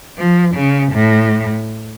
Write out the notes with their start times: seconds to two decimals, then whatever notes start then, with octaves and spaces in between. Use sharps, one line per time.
0.18 F3
0.55 C#3
0.92 A2